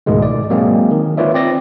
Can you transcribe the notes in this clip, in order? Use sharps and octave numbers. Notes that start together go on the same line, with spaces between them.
C#2 G#2 B2 D#3 G#3 A3
D5
F#3 G#3 A#3 C4 G#4
D#3
F4 B4 C#5 D5 E5
C4 D5 A#6